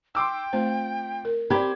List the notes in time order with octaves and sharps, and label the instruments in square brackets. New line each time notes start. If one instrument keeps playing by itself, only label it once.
[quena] G5 [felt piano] C6 D6 E6
[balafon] A3 C4 C5 [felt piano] F4
[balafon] A#4
[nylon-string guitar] C4 G4 [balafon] D5 A#5 [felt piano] B5 G#6